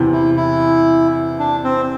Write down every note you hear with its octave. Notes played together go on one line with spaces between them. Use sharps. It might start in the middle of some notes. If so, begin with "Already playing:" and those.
Already playing: E2 C3 E3
E4
E4
D4
C4